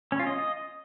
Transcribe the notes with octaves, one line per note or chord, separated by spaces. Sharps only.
C#4
F4
D#5